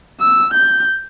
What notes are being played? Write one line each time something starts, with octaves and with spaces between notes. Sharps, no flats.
E6
G6